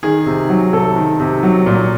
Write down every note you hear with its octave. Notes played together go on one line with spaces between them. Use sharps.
D#3 G#4
C3
F#3
C3 A4
D#3
C3
F#3
A#2